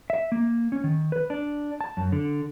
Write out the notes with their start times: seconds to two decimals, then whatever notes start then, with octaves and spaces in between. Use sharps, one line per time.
0.10 E5
0.32 A#3
0.72 C#4
0.84 D#3
1.12 B4
1.30 D4
1.81 A5
1.97 F#2
2.12 D3